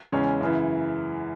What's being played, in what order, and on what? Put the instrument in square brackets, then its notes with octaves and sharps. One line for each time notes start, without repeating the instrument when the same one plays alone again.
[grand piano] E2 C#3 G#3 C#4
F#2 C#3 E3